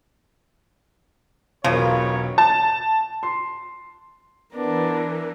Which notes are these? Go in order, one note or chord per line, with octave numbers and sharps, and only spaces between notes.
E1 B1 C#3 F3 B3 A#4 C#5
A5
C6
E3 B3 D4 A#4